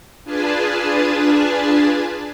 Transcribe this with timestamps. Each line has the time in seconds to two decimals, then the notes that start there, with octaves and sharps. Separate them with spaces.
0.25 D4 F4 G#4 B4 G#5 A5